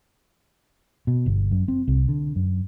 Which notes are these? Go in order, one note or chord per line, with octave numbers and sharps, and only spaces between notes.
B2
G1
F#2
C4
C2
D3
F#2